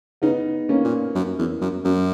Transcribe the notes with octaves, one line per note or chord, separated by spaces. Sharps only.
C#3 B3 D#4
A#3 C#4
A#2
F#2
E2
F#2
F#2